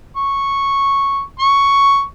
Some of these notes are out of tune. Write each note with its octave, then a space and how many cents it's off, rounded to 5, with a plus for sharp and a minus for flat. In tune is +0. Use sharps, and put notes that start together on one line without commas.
C#6 -5
C#6 +5